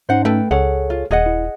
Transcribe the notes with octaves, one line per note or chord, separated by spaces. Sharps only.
G#2 C#4 D#4 C5 F#5
A3 A4 B4 G5
C#2 G#4 A4 C#5 F#5
F4
D#1 G#4 D#5 F#5
E4